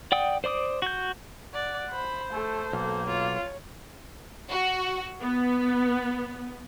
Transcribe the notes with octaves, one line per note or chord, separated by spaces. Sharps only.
D5 F#5 G5 D#6
C5 D5 D6 D#6
F#4 G6
D5 F#5
C5 B5
A3 A4
B1 A#3
F4 C#5
F#4
B3